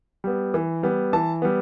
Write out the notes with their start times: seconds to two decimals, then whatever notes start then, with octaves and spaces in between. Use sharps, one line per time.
0.24 G3 B3
0.54 E3
0.83 G3 B3
1.13 E3 A5
1.42 G3 B3